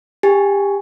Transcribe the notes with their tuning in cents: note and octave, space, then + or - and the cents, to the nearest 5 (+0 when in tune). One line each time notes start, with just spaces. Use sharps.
G4 +25 G#5 +0